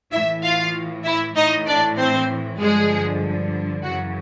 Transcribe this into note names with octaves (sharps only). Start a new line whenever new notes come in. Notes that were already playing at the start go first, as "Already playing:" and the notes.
A2 E3 E4 E5
F4 F5
E4 E5
A2 E3 D#4 D#5
D4 D5
C4 C5
G2 D3 F3 G#3 G#4
F#2 C#3 E3 F#3 F#4